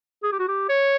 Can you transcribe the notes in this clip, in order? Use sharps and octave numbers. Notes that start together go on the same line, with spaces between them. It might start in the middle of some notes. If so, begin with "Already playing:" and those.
G#4
G4
F#4
G4
C#5